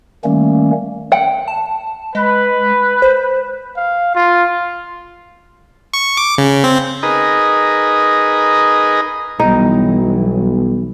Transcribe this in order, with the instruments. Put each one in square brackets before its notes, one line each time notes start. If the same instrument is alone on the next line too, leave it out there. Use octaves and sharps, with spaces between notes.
[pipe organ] D#3 G3 A3 A#3 C#4
[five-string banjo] F#5 G5
[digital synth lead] A5
[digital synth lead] G#3 [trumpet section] B4
[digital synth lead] C5
[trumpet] F5
F4
[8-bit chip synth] C#6
D6
C#3
C4
[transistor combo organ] D#4 G#4 A#4 B4 D#5
[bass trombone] B1 [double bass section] E3 F#3 [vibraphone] G3 B3 [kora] D#4